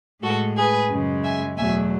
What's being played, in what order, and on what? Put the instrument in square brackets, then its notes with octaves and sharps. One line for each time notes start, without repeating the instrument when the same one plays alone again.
[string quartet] A2 G#3 F#4 A4
G#4 B4
F#2 C#3 G#3
E5 G#5
E2 B2 F#3 A3 E5 G#5